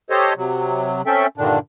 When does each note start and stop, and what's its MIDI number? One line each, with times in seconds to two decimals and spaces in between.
0.10 0.33 67
0.10 0.33 69
0.10 0.33 72
0.10 0.33 73
0.10 0.33 75
0.36 1.02 48
0.36 1.02 54
1.07 1.27 60
1.07 1.27 61
1.07 1.27 69
1.07 1.27 76
1.07 1.27 79
1.38 1.59 43
1.38 1.59 46
1.38 1.59 50
1.38 1.59 51
1.38 1.59 62